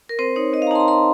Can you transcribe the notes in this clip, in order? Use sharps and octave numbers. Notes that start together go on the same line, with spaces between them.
A#4
C4 C5
D#4 C#5
C4 D#5
F5
A#5
D#4 A5 C6
A#5
D#4 C6